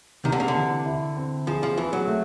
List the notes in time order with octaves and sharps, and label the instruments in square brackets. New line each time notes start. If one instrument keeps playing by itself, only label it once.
[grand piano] C3 [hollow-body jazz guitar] D#3
[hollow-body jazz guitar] D3
C#3
D3
[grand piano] E3
E4
C4
[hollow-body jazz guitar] F3 [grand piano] G#4
[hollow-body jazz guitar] F3
[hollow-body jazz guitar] E3 [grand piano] G#4
[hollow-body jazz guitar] F#3
[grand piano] A3